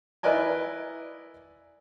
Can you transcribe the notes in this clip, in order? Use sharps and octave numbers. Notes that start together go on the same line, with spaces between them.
E4 A#4 B4 D5 D#5 G#5